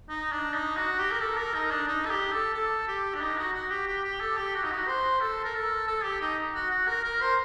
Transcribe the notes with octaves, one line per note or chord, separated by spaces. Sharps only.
D#4
D4
D#4
F#4
G4
A#4
A4
A#4
D#4
D4
D#4
A4
G4
A4
A4
G4
D4
D#4
F#4
F#4
G4
G4
G4
A4
G4
F#4
D#4
F#4
C5
A4
A#4
A4
A4
G4
D#4
F#4
F#4
A#4
A#4
C5